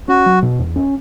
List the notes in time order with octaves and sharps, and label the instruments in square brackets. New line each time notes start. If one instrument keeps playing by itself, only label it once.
[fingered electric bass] C#4 [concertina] F#4
[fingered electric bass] F#3
B2
E2
C#4